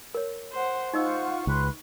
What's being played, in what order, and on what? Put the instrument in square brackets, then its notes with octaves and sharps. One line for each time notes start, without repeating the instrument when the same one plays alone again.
[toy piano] A#4 C#5
[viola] C5 F#5
[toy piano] D#4 D#5 E6 [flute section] F4 C5 F#5 [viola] C#6
[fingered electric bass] C#2 [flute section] B4 C6 F#6